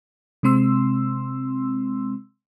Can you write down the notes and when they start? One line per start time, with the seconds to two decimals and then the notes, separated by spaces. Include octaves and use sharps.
0.43 C3 G#3 C4 C6 E6